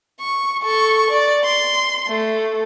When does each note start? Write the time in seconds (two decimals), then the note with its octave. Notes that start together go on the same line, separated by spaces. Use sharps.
0.20 C#6
0.63 A4 C#6
1.10 D5
1.45 C6
2.08 A3